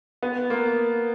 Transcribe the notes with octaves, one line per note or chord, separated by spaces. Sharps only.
B3
A#3